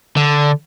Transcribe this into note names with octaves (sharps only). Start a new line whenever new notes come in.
D3